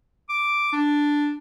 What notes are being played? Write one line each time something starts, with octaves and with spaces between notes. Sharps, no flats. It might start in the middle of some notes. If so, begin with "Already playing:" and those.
D6
D4